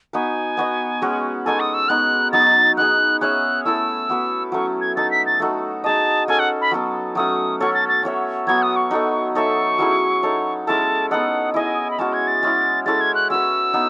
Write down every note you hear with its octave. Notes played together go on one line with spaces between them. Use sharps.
B3 D#4 F#4 B4 G#5
B3 F#4 B4 D#5
G#3 C#4 F#4
G#3 D#4 F#4 A4 G#5
D#6
E6
G#3 B3 D#4 F#6
F#3 B3 D#4 A6
B3 D#4 G#4 F#6
C#4 G#4 C#5 E5 F#6
A3 E4 A4 E6
B3 F#4 B4
F#3 A3 C#4 C#6
G#6
D#4 A4 E5 A6
B6
A6
A3 D#4 F#4 A4
D#4 G#4 D#5 A5
C#4 F#4 A4 G#5
F#5
B5
F#3 B3 F#4 A4
F#3 A3 C#4 F#4 D#6
C#4 F#4 A4 C#5 C#6
A6
A6
C#4 F#4 C#5 E5
F#3 B3 F#4 G#6
D#6
C#6
D#4 F#4 A4 D#5
D#4 A4 C#5 E5 C#6
F#3 C#4 E4 G#4
D#4 A4 C#5
G#3 C#4 E4 A4 A5
B3 D#4 A4 D#5 F#5
E4 G#4 D#5 G#5
B5
G#3 C#4 F#4 A5
G#6
A6
G#3 C#4 E4
G#3 C#4 E4 A4 A6
G#6
F#6
C#4 F#4 B4 E6
B3 D#4